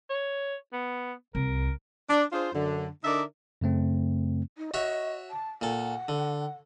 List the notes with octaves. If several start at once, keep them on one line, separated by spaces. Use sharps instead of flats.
C#5
B3
C2 A#4
D4
D4 F4 G#4 C5
F#2 D3
D3 D4 D#4 A#4 D5 E5
F#2 C#3 A3 C4
D#4
F#4 C#5 D#5 E5
A5
A#2 A4 F#5
D3